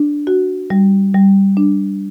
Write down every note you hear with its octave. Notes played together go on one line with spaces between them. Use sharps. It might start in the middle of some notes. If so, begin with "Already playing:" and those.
Already playing: D4
F#4
G3
G3
D4